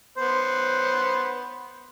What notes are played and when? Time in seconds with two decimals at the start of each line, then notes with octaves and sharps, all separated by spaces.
0.18 B3 C5